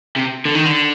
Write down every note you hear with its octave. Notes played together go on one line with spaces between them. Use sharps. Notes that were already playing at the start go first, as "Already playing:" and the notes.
C3
D3
D#3
D3